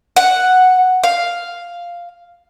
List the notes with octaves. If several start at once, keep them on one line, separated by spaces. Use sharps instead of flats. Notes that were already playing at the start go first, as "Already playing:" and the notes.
F#5
F5